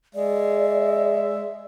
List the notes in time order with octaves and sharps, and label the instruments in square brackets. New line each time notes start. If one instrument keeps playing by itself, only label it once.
[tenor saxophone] G#3 [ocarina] D5 [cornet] E5